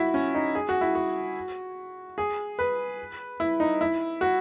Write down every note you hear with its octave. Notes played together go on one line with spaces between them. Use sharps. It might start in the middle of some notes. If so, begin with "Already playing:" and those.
Already playing: E4 F#4
C#4
D#4
G#4
F#4
E4
F#4
G#4
B4
E4
D#4
E4
F#4